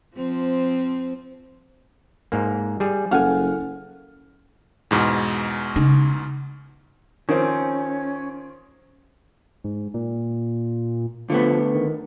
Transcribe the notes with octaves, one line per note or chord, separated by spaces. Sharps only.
F3 C4
G#2 A#3
G3 G#4
F#1 A4 F5 F#5 G#5 F6
E2 G#2 B2
C#3 D#4
D#3 F3 C4 C#4
G#2
A#2
D3 F3 A3 B3
D#3